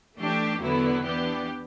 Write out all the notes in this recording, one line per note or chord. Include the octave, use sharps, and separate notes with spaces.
E3 A3 D4 G4
E2 D3 F#3 B3 E4
E3 B3 D4 G4